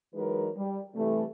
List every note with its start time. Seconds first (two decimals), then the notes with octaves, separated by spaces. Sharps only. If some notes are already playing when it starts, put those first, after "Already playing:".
0.15 E3 F#3 G#3 D#4 A#4 B4
0.56 G3
0.95 C3 E3 G3 A3